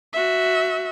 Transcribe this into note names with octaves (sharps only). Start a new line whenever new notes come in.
F#4 E5